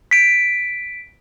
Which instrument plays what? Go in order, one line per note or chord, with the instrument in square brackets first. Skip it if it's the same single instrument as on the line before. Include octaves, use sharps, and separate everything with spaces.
[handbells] B6 D7